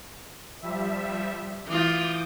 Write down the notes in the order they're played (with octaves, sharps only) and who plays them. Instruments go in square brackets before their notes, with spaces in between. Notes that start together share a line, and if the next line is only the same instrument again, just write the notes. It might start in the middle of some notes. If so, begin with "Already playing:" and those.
[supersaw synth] F3 G3 E5
[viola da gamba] E3 F4 [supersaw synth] D6 D#6 G6